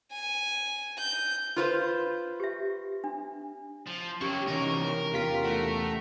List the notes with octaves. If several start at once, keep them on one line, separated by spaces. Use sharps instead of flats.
G#5
G6
F4 B4 C5
G4 E5
D4
F3
F#3 A#3 C#4 G4 C#6
C3 E3 C#4 D#4 A#4
E2 F4 G4 B6
A3 F#5